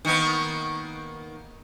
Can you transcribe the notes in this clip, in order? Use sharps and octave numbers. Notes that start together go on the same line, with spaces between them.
D#3 A#3 B3